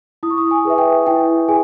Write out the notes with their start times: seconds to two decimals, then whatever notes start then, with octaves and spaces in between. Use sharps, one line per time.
0.23 E4 D#6
0.30 C#6
0.38 D#6
0.51 G#5
0.65 G#4 B4 E5
0.78 G5
1.07 E4 G5
1.48 G#4 G#5